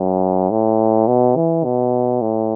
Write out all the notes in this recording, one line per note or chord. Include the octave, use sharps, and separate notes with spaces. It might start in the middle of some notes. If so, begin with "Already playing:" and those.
Already playing: F#2
A2
B2
E3
B2
A2